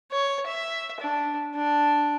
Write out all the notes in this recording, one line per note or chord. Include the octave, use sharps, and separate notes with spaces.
C#5
E5
D4
D4